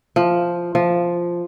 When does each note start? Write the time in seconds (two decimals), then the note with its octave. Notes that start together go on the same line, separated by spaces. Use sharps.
0.16 F3
0.75 F3